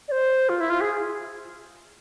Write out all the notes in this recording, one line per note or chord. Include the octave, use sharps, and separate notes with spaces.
D5
C5
F4
E4
F4
G#4